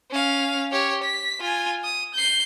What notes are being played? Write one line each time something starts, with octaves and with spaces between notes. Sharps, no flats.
C#4 F5
G4 C#5
B6
F4 G#5
D#6
G6 C7